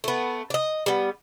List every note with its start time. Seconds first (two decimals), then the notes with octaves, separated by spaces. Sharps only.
0.04 A3 B3
0.50 D5 D#5
0.86 G3 B3